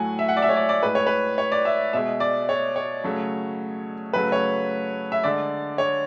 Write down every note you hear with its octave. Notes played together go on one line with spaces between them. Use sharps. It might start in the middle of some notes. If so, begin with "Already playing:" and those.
Already playing: A2 F#3 A3 F#5 G#5
E5
F#5
D5
E5
C#5
D5
D5
A2 G#3 B4
C#5
B4
C#5
D5
E5
B2 G#3 E5
D5
C#5
C#5
C#3 F#3 A3
C#3 F#3 A3 B4
C#5
E5
D3 G#3 D5
C#5